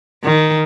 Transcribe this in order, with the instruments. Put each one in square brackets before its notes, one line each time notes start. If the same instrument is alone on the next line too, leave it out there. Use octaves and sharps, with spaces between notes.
[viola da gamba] D#3